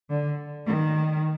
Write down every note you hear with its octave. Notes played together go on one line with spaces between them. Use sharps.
D3
D#3